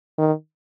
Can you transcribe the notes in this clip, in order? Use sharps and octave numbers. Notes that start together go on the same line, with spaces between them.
D#3